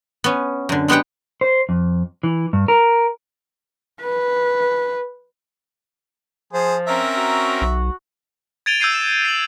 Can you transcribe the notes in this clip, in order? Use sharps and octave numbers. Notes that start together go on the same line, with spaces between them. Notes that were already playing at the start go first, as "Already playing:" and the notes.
B3 C#4
F#2 D3
G#3 B3 G4 F#5 G5
C5
F2
E3
G2
A#4
B4
F3 G#4 C5
C4 C#4 A#4 E5 A#5
F#4
B1
G#6 A6 D7 D#7 F7 G7
E6 G6 G#6 C7 D#7
E7
C7 F#7